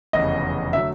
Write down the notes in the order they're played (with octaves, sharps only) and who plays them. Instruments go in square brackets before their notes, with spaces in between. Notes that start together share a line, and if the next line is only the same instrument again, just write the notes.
[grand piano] F1 E2 C#3 [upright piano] D#5
[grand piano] D3 F#3 A3 [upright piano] E5